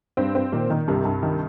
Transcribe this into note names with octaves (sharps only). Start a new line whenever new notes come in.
G2 C4
C4
A#2 D#3
D#3
C2 G2 C3
G2
D#3